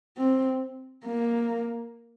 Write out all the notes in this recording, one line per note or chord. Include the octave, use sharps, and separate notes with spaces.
C4
A#3